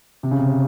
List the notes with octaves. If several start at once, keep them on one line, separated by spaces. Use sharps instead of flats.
C3
C#3
C3